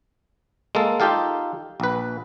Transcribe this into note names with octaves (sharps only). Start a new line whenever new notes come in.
G#3 A#3 A4
D#4 F4 G4 A4 F5
A#1 B4